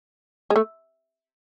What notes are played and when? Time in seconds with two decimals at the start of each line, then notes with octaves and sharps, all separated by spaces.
0.50 G#3
0.56 A3